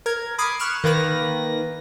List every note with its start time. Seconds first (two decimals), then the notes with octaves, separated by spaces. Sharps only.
0.06 A#4 G#6
0.38 B5 D6 D#6 G#6 C7
0.60 C#6 F6 F#6 E7
0.84 D#3 A#3 B4 A#6